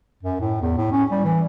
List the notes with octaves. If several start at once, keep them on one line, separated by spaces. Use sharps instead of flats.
F#2
A2
E2
A2
C#4
G3
E3